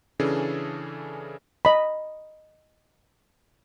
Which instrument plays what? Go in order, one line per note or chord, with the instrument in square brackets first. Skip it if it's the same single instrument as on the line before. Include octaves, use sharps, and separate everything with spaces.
[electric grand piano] C#3 E3 C#4 D4 G#4 A4
[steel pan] D#5 B5